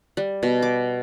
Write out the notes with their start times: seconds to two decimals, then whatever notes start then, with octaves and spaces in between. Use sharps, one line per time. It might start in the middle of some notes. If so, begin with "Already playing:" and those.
0.17 G3
0.43 B2
0.62 D6